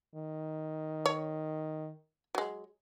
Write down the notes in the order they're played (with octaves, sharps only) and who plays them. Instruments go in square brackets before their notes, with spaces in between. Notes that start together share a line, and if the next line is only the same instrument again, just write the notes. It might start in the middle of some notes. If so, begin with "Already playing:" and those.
[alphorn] D#3
[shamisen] C#5
F#3 G#3